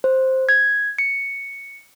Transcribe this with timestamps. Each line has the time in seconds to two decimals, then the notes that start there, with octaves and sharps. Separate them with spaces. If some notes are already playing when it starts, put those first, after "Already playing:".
0.04 C5
0.49 G#6
0.99 C#7